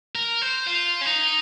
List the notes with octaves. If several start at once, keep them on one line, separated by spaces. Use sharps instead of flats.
A#4
C5
F4
C#4
D#4